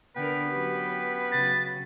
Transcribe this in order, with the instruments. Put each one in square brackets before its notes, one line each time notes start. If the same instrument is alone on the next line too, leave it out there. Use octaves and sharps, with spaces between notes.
[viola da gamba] D3 D4 A#4 [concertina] B3 G5 [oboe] B4
[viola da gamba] F#3 C#4 G4
[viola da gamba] C#3 F#3 [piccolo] A6